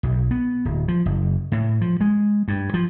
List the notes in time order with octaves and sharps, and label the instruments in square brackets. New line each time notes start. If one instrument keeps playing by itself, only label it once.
[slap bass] B1
B3
D1
F3
F#1
A2
F3
G#3
G2
F3